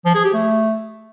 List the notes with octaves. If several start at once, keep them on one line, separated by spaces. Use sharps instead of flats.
F3
G#4
G4
A3